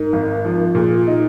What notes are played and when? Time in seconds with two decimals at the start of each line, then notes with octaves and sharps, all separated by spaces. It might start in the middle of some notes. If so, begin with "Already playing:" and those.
Already playing: G#2 A#4
0.13 G#1
0.45 F3
0.75 A#2 G#4
0.96 F4
1.07 D#4 F4